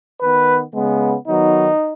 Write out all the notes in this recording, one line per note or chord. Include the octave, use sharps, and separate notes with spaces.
D#3 B3 B4
C#3 G#3 B3
D#3 F#3 B3 D#4